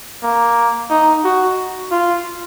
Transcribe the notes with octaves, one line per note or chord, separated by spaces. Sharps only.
A#3
D#4
F#4
F4